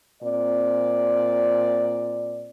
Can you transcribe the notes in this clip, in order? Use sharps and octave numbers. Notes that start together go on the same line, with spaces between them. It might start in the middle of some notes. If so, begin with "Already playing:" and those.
A#2 C4 D5